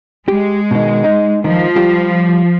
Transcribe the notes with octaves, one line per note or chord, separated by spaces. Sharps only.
G#3 G4
B2 D#3
D#4
D#3 F3
G3 F4 G4